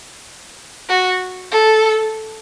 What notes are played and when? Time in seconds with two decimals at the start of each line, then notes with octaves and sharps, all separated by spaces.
0.89 F#4
1.52 A4